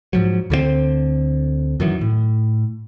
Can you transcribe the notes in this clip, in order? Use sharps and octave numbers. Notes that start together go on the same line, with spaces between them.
G#2 F3 F#3
D2 D3 E3 C4
F#2 D#3 E3 F#3
A2